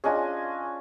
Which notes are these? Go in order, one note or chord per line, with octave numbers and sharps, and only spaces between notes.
C#4 D4 F4 G#4 D#5 G#5